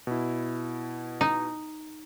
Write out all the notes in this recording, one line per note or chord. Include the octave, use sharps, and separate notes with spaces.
B2 E4
D#4